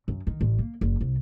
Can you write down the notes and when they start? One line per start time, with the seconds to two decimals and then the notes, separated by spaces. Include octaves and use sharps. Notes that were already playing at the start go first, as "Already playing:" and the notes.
0.08 F#2
0.27 D#3
0.41 A1
0.58 A#3
0.81 F#1
1.01 C2